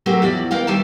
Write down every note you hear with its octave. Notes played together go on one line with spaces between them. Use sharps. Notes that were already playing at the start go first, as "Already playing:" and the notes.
F#3 A3 A#3 C4 F#4 G4
E2 F3 F#4 D5
B2 A#3 F5 G5
D#2 G3 G4 E5 A5